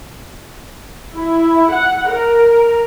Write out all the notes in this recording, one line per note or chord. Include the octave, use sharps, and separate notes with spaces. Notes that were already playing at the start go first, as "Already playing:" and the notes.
E4
F#5
A#4